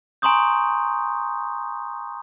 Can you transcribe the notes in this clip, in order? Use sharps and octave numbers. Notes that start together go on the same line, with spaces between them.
G#5 A#5 C6 C#6 D#6 G6